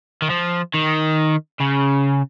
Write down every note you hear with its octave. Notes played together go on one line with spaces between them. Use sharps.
D#3
F3
D#3
C#3